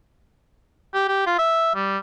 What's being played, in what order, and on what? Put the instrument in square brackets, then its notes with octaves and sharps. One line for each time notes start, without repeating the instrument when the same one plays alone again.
[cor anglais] G4
G4
F4
E5
G3